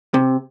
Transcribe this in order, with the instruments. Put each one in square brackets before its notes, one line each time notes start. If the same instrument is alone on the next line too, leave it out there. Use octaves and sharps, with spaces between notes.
[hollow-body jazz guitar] C3